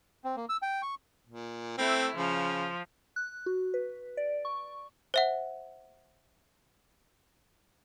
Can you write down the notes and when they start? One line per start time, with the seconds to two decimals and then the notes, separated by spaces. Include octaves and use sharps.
0.24 C4
0.36 A#3
0.49 E6
0.62 G5
0.82 C#6
1.27 A#2
1.78 A3 C4 E4
2.15 C#3 F3
3.16 F#6
3.46 F#4
3.74 B4
4.17 D5
4.45 C#6
5.14 C5 E5 F#5